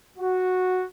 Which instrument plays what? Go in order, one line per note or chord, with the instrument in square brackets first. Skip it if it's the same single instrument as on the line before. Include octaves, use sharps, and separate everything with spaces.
[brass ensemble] F#4